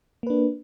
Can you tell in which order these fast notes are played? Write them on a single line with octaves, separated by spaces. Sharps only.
A#3 B4 D4